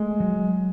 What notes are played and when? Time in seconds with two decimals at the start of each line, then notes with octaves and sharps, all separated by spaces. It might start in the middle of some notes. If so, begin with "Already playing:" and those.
Already playing: G#3 A3
0.20 F#3